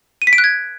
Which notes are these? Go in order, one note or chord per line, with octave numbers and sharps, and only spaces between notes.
D#7
B6
D7
F#6
G#6